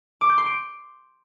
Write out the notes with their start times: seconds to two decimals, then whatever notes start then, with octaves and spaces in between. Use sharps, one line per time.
0.21 D6
0.29 G6
0.38 C6
0.46 D7